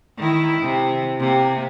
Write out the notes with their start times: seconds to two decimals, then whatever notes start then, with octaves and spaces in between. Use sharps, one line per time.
0.17 D#3 E4
0.62 C3
1.20 C3 A#3